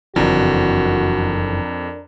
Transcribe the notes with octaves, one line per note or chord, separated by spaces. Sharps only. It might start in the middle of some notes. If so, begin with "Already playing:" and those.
F#1 F2 E3 D4 F#4 A#4